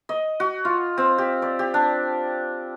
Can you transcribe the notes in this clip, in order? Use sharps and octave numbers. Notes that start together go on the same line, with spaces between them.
D#5
F#4
F4
C4
G4
D5
G4
D4